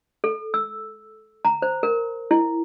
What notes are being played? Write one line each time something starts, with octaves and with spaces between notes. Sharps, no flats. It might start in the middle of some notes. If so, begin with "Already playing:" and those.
A4
E6
A#5
C5
A#4
E4